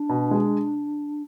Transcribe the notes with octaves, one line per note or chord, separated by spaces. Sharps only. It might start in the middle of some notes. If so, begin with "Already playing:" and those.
Already playing: D4
B2
G#3